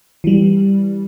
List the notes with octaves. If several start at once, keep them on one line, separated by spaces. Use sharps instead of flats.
E3 G3